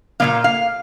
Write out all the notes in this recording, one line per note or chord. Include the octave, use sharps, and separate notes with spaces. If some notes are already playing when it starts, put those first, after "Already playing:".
A#2 G3 A#3 F5
F5